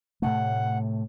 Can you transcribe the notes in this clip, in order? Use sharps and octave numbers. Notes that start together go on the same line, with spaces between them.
A2 C3 A3 F#5